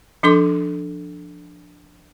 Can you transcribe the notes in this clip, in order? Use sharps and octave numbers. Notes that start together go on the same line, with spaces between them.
F3 D4 A4 C6 D6